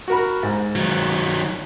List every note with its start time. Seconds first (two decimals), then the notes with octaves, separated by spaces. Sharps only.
0.08 F#4 A#4 B5
0.43 G#2
0.75 D#3 F#3